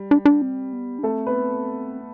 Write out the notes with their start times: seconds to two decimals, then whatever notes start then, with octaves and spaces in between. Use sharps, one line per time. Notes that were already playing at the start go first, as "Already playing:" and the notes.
Already playing: G3
0.11 D4
0.25 D4
0.42 C4
0.73 B3
0.99 D4
1.03 A3 C4 A4
1.26 B3 B4